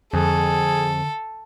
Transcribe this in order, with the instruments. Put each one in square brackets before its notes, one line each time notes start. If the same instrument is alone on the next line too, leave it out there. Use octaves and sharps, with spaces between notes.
[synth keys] F2 [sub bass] D3 [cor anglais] G#4 [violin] A4